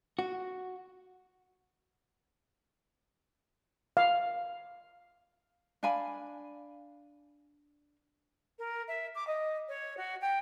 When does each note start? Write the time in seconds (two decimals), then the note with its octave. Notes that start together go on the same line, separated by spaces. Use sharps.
0.19 F#4
3.97 F5
5.83 D4 F5 G#5 B5
8.58 A#4
8.87 E5
9.15 D6
9.27 D#5
9.68 C#5
9.97 F#4
10.21 G5